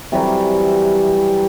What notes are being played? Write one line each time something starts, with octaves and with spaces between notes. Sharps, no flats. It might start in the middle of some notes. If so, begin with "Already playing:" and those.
C3 E3 F#3 G3